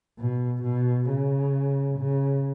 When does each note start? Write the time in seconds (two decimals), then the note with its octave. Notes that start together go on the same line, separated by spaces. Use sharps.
0.19 B2
0.63 B2
1.09 C#3
1.99 C#3